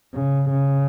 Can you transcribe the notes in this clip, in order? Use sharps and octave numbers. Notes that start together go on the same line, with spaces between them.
C#3
C#3